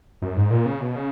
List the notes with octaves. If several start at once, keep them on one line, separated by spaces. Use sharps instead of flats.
F#2
G#2
A#2
C#3
B2
C#3